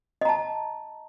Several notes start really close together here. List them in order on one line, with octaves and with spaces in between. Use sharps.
D#5 A#5 A5